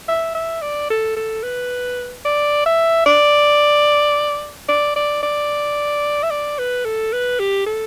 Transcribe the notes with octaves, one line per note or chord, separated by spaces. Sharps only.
E5
E5
D5
A4
A4
B4
D5
E5
D5
D5
D5
D5
E5
D5
B4
A4
B4
G4
A4